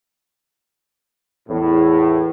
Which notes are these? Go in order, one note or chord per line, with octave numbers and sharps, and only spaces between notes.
E2 A2